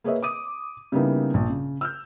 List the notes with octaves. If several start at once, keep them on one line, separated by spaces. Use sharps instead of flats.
A#3 G#4 B4 C#5 D#5 E5
D6 D#6 D#7
C#3 G3 A#3 B3 D#4 E4
A#1
C#3
E6 F6 G6